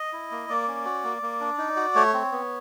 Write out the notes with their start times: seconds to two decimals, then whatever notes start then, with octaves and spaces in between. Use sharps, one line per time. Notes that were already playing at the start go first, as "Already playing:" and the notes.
Already playing: D#5
0.13 E4
0.31 A#3
0.49 A#3 D5
0.68 C#4
0.85 F#4
1.04 A#3
1.22 A#3
1.41 D4
1.58 D#4
1.76 F#4
1.95 A3 C#5
2.14 C4
2.32 B3